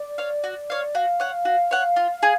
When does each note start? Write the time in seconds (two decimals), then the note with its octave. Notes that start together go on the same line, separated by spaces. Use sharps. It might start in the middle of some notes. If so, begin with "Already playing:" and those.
Already playing: D5
0.18 C#5 F5
0.44 F#4
0.70 C#5 F5
0.95 F#4 F5
1.20 C#5 F#5
1.45 F#4
1.71 C#5 F#5
1.96 F4
2.23 G#4